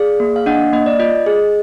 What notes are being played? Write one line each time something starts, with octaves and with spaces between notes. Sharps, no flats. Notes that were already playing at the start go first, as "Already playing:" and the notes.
Already playing: G#4 D5 F5
A#3
F5
D4 D#5 F#5
A#3 D#5
D5
F4 D#5
G#4